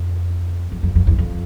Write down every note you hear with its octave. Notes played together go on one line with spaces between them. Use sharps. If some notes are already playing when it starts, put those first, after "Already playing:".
Already playing: F2
F2
F2
F2
E2
F2